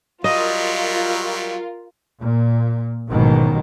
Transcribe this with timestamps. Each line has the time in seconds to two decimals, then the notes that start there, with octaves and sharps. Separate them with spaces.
0.24 F#3 G3 F4 A#4 D#5
2.20 A#2
3.08 A1 G#2 B2 D#3 F#3